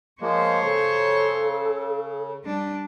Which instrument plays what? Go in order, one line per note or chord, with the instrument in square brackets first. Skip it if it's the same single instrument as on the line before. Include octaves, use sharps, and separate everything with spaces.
[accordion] F3 G#3 A#3 [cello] C5 C#5
[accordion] C#3 [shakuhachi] A4
[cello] G3 D4